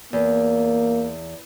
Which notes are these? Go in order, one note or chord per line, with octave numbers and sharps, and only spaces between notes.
E2 A#3